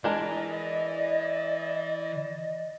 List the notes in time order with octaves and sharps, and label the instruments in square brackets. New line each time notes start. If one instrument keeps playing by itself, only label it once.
[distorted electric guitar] E3 [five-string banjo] G#3 D4 A#4 [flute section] D5 D#5